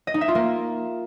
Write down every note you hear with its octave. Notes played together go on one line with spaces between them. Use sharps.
D#5
D#4
E5
F4
A#3